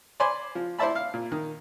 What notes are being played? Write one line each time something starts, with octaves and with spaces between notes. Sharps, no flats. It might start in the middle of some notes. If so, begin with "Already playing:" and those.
C5 D5 G#5 B5 C6 D6
F3
E4 C5 D5 E5 A5 B5
F5
A#2
D#3